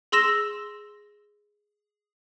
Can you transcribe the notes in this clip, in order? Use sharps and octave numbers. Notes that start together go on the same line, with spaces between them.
G#4 C6 E6 A#6 E7